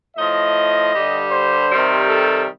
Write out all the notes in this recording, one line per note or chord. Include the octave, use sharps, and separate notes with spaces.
A2 F3 D#5
G2 D3 G3
C5
C3 D#3 G3
A4